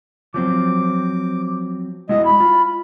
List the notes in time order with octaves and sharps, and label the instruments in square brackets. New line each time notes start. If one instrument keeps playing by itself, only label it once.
[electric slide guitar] F3 F#3 C4 [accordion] D6
[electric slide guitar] G#3 E4 F#4 [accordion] D#5
[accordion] B5
[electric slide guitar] F4